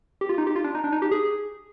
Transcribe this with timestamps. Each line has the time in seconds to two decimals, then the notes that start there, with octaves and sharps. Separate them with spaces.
0.21 G4
0.29 F4
0.38 D#4
0.47 G4
0.56 F4
0.64 D4
0.75 D#4
0.84 D4
0.92 D#4
1.02 G4
1.11 G#4